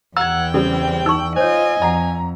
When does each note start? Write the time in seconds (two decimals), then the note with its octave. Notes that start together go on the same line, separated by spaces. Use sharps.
0.16 E2 F#5 G5 A#5 E6 G#6
0.54 C#3 G3 C4 A4
1.06 D#4 D5 C#6 E6 F#7
1.36 F4 C5 C#5 D#5 G#5
1.82 F2 D5 F#5 A#5